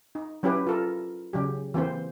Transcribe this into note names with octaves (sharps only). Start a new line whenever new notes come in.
D#4
F#3 C#4 E4 G4 B4
F4 A4 A#4
C#3 F#3 G4
E3 A#3 C4 C5